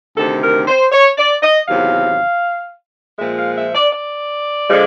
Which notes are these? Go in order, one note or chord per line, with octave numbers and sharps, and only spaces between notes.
D2 C3 D#3 A4
A#4
C5
C#5
D5
D#5
E2 C3 D#3 F#3 F5
A#2 F3 G#3 E5
F5
E5
D5
D5
D3 F3 G#3